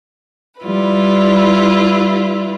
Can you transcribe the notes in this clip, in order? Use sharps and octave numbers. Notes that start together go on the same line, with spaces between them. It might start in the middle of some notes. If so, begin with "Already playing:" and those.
G3 E4 F4 B4